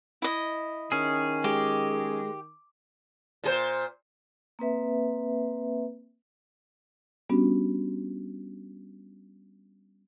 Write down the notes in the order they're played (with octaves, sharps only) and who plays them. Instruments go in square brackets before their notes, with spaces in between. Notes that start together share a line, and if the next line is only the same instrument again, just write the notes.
[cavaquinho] E4 D#5
[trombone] D#3 [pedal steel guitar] C#4 G#4
[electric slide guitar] G#3 [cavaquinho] G4
[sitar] A#2 G#4 C5
[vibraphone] A#3 C4 B4 E5
[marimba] G3 B3 C#4 D4 F#4 G4